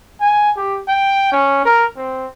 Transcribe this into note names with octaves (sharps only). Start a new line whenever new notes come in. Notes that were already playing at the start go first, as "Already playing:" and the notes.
G#5
G4
G5
C#4
A#4
C4